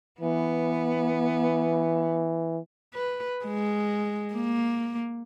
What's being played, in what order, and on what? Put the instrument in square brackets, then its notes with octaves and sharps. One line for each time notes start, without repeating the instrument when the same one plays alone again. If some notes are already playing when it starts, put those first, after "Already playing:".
[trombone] E3 [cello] B3
[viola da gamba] B4
G#3
A#3